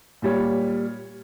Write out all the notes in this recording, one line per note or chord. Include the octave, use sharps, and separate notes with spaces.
A#2 G3 C#5